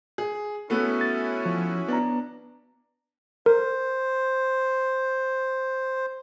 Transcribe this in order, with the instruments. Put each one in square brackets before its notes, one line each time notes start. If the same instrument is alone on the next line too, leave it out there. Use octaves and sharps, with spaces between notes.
[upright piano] G#4
[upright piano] A3 B3 [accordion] C#4 E4 F#4
[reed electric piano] A6
F3
[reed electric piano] B3 A#5 [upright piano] D4
[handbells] A#4 [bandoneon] C5